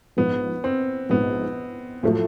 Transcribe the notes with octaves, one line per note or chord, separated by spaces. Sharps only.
A#1 G#2 F3 B3
C4
A#1 G#2 F3 B3
A2 F3 F#3 A3